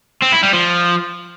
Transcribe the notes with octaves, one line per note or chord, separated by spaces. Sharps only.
C4
E4
G3
F3